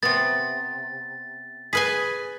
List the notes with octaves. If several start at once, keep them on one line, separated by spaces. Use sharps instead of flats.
C3 B3 A6
G#4 B4 G#5 B6